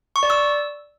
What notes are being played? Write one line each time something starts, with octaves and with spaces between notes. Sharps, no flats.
C#6
D5
E6